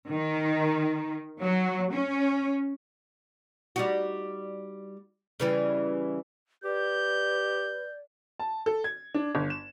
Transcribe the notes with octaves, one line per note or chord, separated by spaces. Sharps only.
D#3
F#3
C#4
G3 D#4 F#4
C#3 E3 G3
G4 B4 D5 G6
A5
A4
G#6
D4
G1
E7